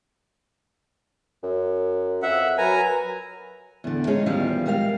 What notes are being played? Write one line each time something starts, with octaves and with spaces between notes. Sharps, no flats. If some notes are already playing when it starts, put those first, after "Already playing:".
F#2
F2 E5 F#5
F#3 A#4 B4 G#5 A#5
E2 D3
G#3 C#4 D#4 G#4
E2 D#3 F3 G3 F5
G3 G#3 A#4 E5 F5